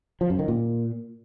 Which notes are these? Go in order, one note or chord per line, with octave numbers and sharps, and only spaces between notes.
F3
F#2
D#3
A#2